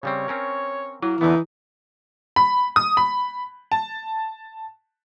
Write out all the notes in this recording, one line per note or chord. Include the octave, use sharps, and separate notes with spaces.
C#3 G3 C4 C#5
C4 C#4 A#4
F#3 A#3 E4
E2 D3 E3 B3 D#4
B5
D#6
B5
A5